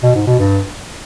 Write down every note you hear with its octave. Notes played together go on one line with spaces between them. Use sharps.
B2
G#2
B2
G2